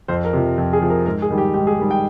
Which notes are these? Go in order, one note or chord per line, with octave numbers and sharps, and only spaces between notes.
F2 C5
A#4
C3 F3
F2
G#4
C3 F3
A#4
G#2 A#4
G#4
D#3 G3
G4
G#2 G4
G#4
D#3 G3
G5